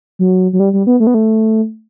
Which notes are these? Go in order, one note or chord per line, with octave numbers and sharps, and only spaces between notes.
F#3
F#3
G3
G3
B3
A3
B3
A3